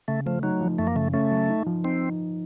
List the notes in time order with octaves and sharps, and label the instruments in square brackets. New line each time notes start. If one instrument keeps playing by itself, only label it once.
[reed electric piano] C#3 [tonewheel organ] A3
[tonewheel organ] F3 [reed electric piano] A3
[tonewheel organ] F#3 [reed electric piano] D#4
[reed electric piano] F3
[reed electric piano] F#2 [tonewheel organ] A3
[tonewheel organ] A#3
[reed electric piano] C#3 [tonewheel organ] A3
[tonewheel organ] A3 [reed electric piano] C#4
[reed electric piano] F#3
D#4
F3
[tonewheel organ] C4 [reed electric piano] D#4